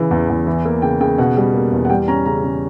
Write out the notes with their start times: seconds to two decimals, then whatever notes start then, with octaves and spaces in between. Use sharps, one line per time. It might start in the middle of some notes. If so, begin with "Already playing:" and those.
Already playing: C#3 E3
0.11 E2
0.29 E2
0.47 E3
0.65 A#3
0.82 C#3 G5
1.01 C#3 G5
1.18 B2 F#5
1.37 G3
1.54 A#3
1.72 E2
1.85 F#5
1.90 G3 G5
2.08 C#4 A#5
2.26 C#3 A#5
2.44 C#3